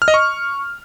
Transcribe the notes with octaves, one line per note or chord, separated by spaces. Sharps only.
F6
D#5
C#6